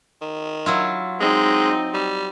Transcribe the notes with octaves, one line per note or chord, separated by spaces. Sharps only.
D#3
F#3 E4 F4
G#3 C4 D#4
G3